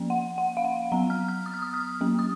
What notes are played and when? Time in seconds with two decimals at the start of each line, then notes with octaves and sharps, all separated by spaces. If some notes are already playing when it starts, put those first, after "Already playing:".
Already playing: F3 A#3 C#4
0.10 F#5
0.38 F#5
0.57 F5
0.64 F#5
0.92 F#3 B3 A#5
1.10 F6
1.28 F6
1.46 D#6
1.54 F6
1.62 D#6
1.74 F6
2.01 F#3 A#3 C#4
2.19 D#6